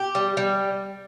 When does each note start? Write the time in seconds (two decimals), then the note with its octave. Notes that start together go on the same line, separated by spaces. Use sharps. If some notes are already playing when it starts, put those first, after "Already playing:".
Already playing: G4
0.15 G3
0.37 G3